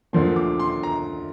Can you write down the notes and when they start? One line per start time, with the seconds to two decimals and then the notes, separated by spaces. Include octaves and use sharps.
0.13 D2 D3 F3 A#3 C6
0.36 D6
0.60 C6
0.83 A#5